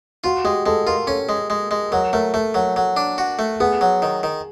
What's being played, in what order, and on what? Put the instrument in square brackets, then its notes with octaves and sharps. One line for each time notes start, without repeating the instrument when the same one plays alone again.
[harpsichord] F4 [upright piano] F#4
[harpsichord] G#3 [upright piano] G4
[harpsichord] G#3 [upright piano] A4
[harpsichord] F4 [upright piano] A#4
[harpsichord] C#4 [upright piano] A4
[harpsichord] G#3
G#3
G#3
[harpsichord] F#3 [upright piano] A#4
[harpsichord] A3 [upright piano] A#4
[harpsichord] A3 [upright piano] A4
[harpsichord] F#3 [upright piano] A#4
[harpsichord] F#3 [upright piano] A4
[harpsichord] D4
F#4
A3
[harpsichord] B3 [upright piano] G#4
[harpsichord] F#3
D#3
D#3